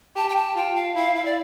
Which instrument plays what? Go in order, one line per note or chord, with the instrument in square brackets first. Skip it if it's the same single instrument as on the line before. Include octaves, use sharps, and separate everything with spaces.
[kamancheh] G4 [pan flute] A5
[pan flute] G5
A5
[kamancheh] F4 [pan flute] G5
[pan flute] F5
[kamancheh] E4 [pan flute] F5
[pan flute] F5
D5